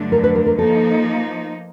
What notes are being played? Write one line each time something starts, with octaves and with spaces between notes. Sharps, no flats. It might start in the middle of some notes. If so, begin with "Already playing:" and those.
Already playing: G2 D3 F#3 A3 D4
A#4
B4
A#4
A#4
F3 A#3 D#4 A4